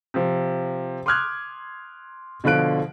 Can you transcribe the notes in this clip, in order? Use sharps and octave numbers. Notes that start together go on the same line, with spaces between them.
C3 F3
C6 D6 D#6 F6 F#6 G#6
B2 D3 F3 F4 F#6 D7